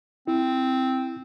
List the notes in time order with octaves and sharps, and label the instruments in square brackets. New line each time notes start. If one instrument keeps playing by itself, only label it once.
[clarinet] C4 [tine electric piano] E4